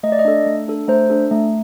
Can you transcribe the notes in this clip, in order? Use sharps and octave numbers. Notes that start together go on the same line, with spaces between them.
A3 D#5
D5
D#5
D4 A4
A3
D4 A4
A3 C5
D4 A4
A3